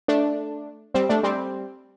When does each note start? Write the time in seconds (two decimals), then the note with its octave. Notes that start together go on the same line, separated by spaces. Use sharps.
0.08 A3 D4
0.94 G3 C4
1.09 A3 D4
1.23 G3 C4